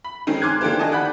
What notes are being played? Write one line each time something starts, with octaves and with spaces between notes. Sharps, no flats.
B5
D#3 G#3 C4 C#4 D#4
G#5 C6 D6 F6 F#6 G#6
E3 A3 A#3 D4 G4 C5
D#3 D#5 G#5 A5
D5 F#5 B5 G6